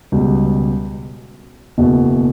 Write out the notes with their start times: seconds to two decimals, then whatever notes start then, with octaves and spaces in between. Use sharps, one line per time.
0.12 C#2 B2 G3
1.78 F#1 E2 B2